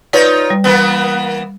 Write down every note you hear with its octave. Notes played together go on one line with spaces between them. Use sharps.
D#4 F4 B4 C#5 D5
G3
E3 A#3 B3